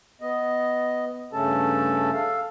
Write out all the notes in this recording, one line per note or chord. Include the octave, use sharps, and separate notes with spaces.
B3 D#5
G2 C#3 A3 C#4 A4 A5
A4 F5